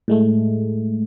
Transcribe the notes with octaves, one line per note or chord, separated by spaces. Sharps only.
A2 G#3 A3